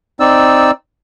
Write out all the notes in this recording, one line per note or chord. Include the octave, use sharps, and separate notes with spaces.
C4 D#4 D5 E6